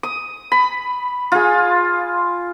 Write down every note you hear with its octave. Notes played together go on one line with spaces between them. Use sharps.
D#6
B5
F4 G#4